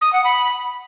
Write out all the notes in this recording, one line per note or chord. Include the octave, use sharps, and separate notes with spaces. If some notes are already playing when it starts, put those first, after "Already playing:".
D#6
F#5
B5